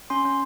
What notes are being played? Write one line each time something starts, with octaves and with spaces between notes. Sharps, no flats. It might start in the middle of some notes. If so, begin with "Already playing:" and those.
C#4 C6
C#4